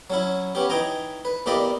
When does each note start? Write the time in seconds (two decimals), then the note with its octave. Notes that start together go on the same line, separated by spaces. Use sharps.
0.10 F#3 C#4 E4
0.55 B3 C#4 G4
0.69 E3 D#4 G5 G#5 A#5
1.25 B4
1.46 E2 A#3 G4 D5 D#5 B5